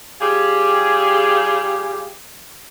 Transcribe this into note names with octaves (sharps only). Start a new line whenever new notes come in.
G3 F4 G4 G#4